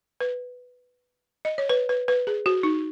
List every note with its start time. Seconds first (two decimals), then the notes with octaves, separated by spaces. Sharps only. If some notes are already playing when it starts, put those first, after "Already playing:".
0.21 B4
1.45 D#5
1.58 C#5
1.69 B4
1.89 B4
2.08 B4
2.27 G#4
2.46 F#4
2.63 D#4